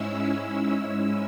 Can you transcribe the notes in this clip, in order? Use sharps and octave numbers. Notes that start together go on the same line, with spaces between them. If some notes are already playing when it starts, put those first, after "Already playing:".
Already playing: G#2 G#3 C#4 E4 E6
E6